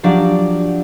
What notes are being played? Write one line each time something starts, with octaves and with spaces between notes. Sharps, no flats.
F3 F#3 D4 G4 D5